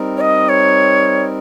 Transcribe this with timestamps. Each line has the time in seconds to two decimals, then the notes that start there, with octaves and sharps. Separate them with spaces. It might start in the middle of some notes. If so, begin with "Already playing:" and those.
Already playing: G3 C4 D#4 A#4
0.17 C#5
0.21 D#5
0.49 C#5